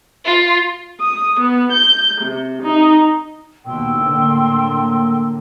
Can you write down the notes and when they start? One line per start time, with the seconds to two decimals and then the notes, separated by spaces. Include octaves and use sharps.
0.25 F4
1.01 D#6
1.39 B3
1.73 G6
2.21 C3
2.62 D#4
3.67 D#2 B2 G5 C6 E6
3.96 A2 D3 A#3